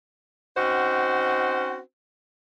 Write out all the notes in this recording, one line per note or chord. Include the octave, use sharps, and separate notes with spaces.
C4 C#4 D#4 F#4 C5 F#5